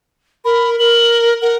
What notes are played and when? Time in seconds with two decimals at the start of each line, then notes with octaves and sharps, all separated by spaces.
0.45 A#4 B5
0.79 A#4 F#7
1.42 A#4 F#5